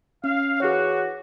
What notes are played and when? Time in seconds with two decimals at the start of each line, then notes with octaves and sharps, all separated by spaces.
0.24 C#4 F5
0.60 E3 F#4 G#4 C#5